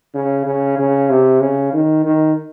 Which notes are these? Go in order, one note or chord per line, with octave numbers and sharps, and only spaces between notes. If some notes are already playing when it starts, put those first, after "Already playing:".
C#3
C#3
C#3
C3
C#3
D#3
D#3